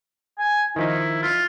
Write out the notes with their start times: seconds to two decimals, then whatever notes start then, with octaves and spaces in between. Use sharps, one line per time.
0.38 G#5
0.76 D#3 F3 D#4 E4
1.23 F4